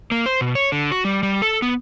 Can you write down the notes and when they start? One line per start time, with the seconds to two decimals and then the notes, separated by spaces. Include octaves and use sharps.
0.11 A#3
0.26 C5
0.41 B2
0.55 C#5
0.72 D3
0.92 F#4
1.05 G3
1.23 G3
1.42 A4
1.62 B3